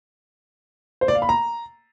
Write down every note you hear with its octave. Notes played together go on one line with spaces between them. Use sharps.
C5
D5
F5
B5
A#5